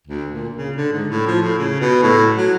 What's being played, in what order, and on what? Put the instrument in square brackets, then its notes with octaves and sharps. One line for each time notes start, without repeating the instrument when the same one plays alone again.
[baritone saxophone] D2
A#2
C#3
D3
G#2
A2
F3
A2
C#3
B2
A2
F#3